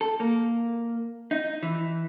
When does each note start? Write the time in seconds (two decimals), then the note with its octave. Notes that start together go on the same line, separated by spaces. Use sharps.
0.01 A4
0.20 A#3
1.31 D#4
1.63 E3